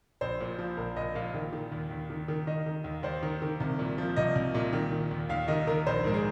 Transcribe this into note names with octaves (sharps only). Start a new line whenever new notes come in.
A#1 C5
A#2
F3
A#1 A#4
A#1 D#5
A#2 F5
D#3
D#3
D#2
D#2
D#3
D#3
D#3 D#5
D#3
D#2
D#2 C5
D#3
D#3
C2
A#2
F3
C2 D#5
C2
A#2
D#3
D#3
D#2
D#2 F5
D#3 D#5
D#3 A#4
A#1 C5
G#2 A#4
G#4